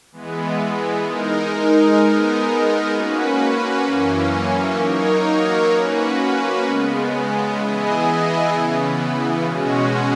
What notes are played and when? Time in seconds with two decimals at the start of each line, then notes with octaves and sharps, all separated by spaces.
0.12 E3 G#3 B3
1.05 G#3 D#4 A#4
1.97 G#3 B3 D#4 A#4
2.91 A#3 C#4 F#4 B4
3.85 F#2 E3 A#3 C#4
4.77 F#3 A#3 D#4 A#4 C#5
5.70 A#3 C#4 F#4 B4
6.63 C#3 G#3 B3
7.57 E3 B3 E4 G#4 D#5
8.50 C#3 E3 B3
9.44 B2 G#3 C#4 F#4